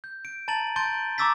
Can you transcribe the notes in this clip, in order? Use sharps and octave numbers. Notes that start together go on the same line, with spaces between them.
G6
D7
A5 A#5 A6 D#7 F#7
A5 C6 G6 A6 D7 G7
A#5 C#6 D6 E6 A6 B6